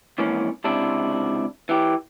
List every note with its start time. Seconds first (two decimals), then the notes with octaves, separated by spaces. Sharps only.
0.18 F2 G#2 E3 A#3 C#4
0.64 C#2 C3 D4 E4
1.69 E3 G4